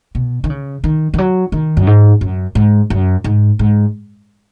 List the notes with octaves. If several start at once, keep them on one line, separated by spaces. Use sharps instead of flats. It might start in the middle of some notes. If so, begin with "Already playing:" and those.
B2
D#3
C#3
D#3
D#3
F#3
D#3
F#2
G#2
F#2
G#2
F#2
G#2
G#2